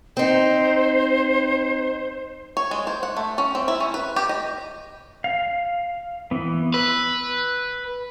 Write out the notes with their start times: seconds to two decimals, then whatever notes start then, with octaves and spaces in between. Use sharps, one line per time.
0.17 C4 D#4 C5
2.57 C#5
2.71 G#3
2.87 C5
3.03 F#5
3.17 A3
3.38 C#4
3.55 C4
3.68 E4
3.80 C#4
3.94 B4
4.16 G4
4.29 D#5
5.24 F5
6.31 E3 B3
6.74 B4 E6